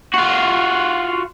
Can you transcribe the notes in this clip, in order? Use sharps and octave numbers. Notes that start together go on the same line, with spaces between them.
F4 F#4